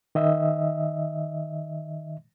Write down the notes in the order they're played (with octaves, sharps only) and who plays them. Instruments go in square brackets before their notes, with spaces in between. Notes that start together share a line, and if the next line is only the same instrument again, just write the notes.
[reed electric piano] D#3 D#5 E5